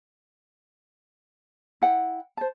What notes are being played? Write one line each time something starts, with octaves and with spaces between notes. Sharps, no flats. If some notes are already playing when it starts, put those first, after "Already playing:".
E4 F#5 G5
C5 A5